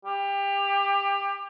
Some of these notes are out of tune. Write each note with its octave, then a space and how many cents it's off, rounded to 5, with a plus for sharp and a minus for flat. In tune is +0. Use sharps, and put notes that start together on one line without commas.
G4 +25